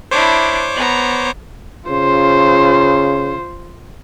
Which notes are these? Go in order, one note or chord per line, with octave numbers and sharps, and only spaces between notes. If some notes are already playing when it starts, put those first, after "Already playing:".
D4 E4 C5 C#5 D6
B3 A#5
C#3 F4 C5